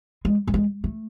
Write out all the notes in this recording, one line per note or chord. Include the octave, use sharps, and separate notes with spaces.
G#3
A3
G#3
A3